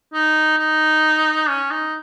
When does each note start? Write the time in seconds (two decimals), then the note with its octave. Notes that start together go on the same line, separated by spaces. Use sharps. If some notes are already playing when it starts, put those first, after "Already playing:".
0.13 D#4
0.58 D#4
1.49 C#4
1.71 D#4